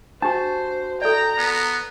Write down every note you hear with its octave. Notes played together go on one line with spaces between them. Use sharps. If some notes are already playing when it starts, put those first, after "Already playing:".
D4 F#4 G4 C5 A5
A4 D5 G5 A#5
B3